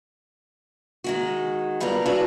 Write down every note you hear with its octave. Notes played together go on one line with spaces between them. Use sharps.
D#3 G#3 F#4
D3 G3 B3 F4 A#4 D5
D4 E4 F#4 G#4 B4 C#5